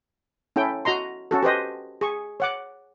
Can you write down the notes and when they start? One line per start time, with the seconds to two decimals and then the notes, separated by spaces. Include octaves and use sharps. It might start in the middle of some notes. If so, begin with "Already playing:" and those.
0.56 C#4 E4 A4 G5
0.85 F#4 D#5 A#5 C6
1.31 C#4 F#4 A4
1.43 G4 B4 C5 D#5
2.01 G#4 C#6
2.40 C#5 F#5 D6